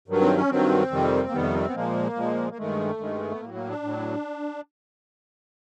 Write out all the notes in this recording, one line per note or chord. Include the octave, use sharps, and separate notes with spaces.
G2 D#3 F#3
C4
C#4
G2 D#3 F#3 C4
F2 C3 D#3 G3
A#3
F2 C3 D#3 G3 B3
C4
B3
A#2 F3 G#3 A#3
A#2 F3 G#3
A#3
G2 D#3 G#3 A3
G2 D#3 G#3
B3
A2 F#3 A#3
A#3
D4
A2 F#3